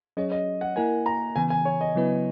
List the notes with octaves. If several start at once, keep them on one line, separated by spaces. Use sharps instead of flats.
F#3 C#4 G#4 C#5 D#5
D#5
F#5
A#3 E4 A#4 G#5
A#5
C#3 E3 B3 G#5
G#5
C#5
D#5
C#3 F#3 B3 E4 B4